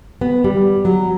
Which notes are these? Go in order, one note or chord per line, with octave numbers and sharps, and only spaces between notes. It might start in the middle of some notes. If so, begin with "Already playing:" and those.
B3
G3
F#3